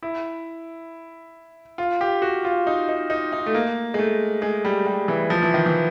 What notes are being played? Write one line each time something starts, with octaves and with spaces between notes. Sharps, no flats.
E4
F4
G4
F#4
F4
D#4
D#4
D#4
D#4
A3
A#3
G#3
A3
G#3
G3
G3
E3
F3
E3
D#3
E3